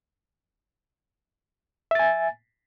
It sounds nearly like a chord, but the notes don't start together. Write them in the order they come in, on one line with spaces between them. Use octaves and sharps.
E5 A6 G#5